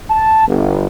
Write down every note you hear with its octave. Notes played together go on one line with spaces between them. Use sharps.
A5
G1